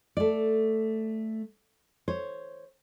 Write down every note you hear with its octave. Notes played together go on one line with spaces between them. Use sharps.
A3 D5
C5 C#5